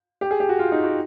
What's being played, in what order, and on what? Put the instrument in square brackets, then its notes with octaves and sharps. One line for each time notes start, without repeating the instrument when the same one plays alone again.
[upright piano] G4
G#4
G4
F#4
F4
D#4
F#4